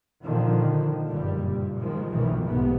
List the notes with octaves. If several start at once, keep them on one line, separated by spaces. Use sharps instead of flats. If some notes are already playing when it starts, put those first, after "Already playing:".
A#2 D3 D#3 F3
F#1 G2 A#2 G3
A#2
D#3 F3 G#3
F#1 B1 A#2 D#3 E3
B1 G#2 C3 B3